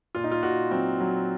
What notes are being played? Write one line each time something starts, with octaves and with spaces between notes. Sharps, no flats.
A#2 F4
D#4
F4
A#2 F#4
F#3 C4
F#3